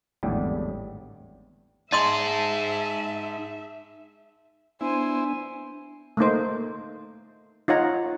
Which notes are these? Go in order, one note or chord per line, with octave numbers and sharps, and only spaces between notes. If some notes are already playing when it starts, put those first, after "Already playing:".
G#1 E2 A2 D3 G3
D#4 G#4 D#5 E5 A5 C6 D#6
B3 D4 E4 C5 G#5
A3 A#3 D#4 C5
D#4 F4 C#5 F#5 A#5